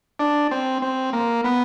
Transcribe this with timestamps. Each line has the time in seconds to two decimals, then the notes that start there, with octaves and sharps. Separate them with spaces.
0.19 D4
0.51 C4
0.82 C4
1.13 A#3
1.44 B3